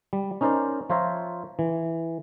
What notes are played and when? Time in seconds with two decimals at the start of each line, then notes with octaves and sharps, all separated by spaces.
0.13 G3
0.41 C#4 D#4 A#4 C5 D5 D#5
0.90 F3 F4 C5 C#5 E5 A#5
1.59 E3